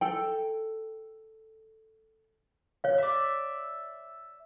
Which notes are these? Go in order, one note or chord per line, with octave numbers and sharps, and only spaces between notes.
A4 G5
C#5 F5
D5 E5